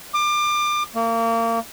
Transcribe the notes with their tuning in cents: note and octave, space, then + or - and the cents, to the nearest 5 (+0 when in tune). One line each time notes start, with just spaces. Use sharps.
D6 +30
A#3 -30